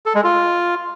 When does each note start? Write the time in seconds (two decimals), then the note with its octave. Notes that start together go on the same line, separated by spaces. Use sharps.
0.06 A4
0.15 G#3
0.24 F4